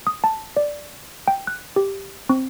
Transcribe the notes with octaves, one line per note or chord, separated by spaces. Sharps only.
D#6
A5
D5
G5
F#6
G4
C4